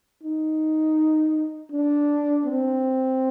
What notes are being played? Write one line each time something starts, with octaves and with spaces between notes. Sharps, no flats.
D#4
D4
C4